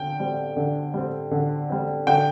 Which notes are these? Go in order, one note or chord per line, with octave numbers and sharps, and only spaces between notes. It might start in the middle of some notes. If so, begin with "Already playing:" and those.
Already playing: D3 G5
G3 C4
D3
G3 C4
D3
G3 C4
D3 G5